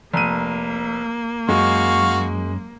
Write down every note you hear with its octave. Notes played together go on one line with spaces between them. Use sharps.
F1 A#3 D#7
F#2 G#3 F#4 F5 C#6